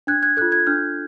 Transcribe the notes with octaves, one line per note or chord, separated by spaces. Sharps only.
D4 F#6 G#6
F#6 G#6
F4 A4 F#6 G#6
F#6 G#6
D4 F6 G6